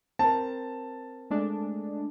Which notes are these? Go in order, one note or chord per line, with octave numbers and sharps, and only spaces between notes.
C4 A#4 A5
G#3 A3 D4